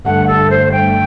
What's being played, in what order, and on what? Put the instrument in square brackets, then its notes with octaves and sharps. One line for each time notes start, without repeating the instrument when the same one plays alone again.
[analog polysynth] G2 D3 A3 [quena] F#5
[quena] A4
C5
G5